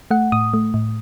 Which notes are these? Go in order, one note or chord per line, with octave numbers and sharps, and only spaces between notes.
A3 F#5
A2 D#6
A3
A2